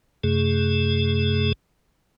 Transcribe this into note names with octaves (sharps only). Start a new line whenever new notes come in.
F#2 C3 A3 G#4